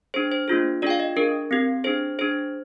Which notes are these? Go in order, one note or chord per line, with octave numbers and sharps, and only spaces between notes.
D4 G#4 C5
C5
A#3 D4 F4 G#4
D4 F4 G#4 D5 G5
F5
D#5
D4 G#4 A#4
C4 G4
D4 G#4 C5
D4 G#4 C5